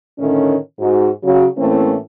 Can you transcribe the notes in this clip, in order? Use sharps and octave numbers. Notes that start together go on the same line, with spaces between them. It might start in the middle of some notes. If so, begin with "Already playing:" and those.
A2 D3 D#3 A3 C#4
G#2 F#4
C#3 F#3 F#4
A2 E3 A3 A#3 C4 C#4